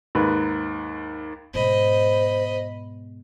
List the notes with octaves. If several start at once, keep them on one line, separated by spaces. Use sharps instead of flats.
D#2 G#2 B4
G#2 B2 C5 D#5 B5